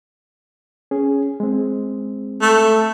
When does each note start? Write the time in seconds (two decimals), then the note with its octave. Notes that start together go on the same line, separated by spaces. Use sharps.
0.91 C#4 G#4
1.40 G#3 C4
2.41 A3